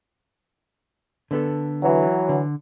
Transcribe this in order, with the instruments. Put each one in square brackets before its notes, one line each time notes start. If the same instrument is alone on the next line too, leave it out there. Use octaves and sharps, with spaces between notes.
[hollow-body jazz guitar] D3 B3 A4
[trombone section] E3 F#3
[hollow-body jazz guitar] D3